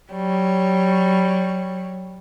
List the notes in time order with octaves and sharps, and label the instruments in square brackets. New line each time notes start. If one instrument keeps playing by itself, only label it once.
[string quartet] F#3 G3 C#5